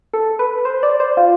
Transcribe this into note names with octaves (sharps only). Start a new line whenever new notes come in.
A4
B4
C5
D5
C5
F4